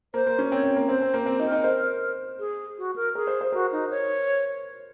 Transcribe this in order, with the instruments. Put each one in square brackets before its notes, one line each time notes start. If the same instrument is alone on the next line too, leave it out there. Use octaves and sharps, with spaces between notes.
[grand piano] A#3 [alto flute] C5
[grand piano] A#3
C#4
[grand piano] C4 [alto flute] C#5
[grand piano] C4
A#3
[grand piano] C4 [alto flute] C5
[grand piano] C4
A#3
[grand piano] C4 [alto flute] C5
[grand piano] D#4
[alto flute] A#4
[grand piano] D#4
C5
[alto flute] G#4
F#4
A#4
[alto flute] G#4 [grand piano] A#4
[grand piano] C5
C5
[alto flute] F#4 [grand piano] A#4
[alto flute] D#4
C#5